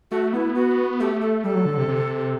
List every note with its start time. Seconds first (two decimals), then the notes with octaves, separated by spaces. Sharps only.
0.11 A3 F#4
0.33 B3 E4
0.55 F#4
1.00 A3 G4
1.21 A4
1.43 G3 A4
1.55 F#3
1.66 D3
1.77 C3
1.88 C3